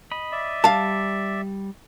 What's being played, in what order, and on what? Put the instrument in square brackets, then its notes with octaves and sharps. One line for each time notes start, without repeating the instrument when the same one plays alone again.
[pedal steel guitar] D#5 B5
[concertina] D5 E5
[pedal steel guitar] G3 [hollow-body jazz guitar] F5 A5